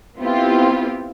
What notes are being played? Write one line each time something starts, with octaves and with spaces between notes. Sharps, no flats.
B3 C4 E4 F4 G4